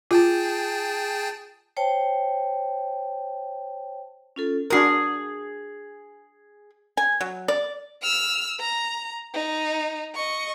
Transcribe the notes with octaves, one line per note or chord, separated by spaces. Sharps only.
F4 G#4 G5 A5
C5 C#5 G5 A5
C#4 F4 A4
D4 F#4 G#4 A#4 D#6
G#5
F#3
D5
E6 F6
A#5
D#4
D#5 C#6